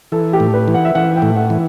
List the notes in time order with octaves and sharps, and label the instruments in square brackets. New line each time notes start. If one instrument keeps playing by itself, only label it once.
[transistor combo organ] E3 [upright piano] A4
[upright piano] G4
[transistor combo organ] A2
[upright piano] B4
[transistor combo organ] E3
[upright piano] F#5
E5
[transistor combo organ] E3 [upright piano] F#5
[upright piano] G5
[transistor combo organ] A2
[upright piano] F#5
[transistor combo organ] E3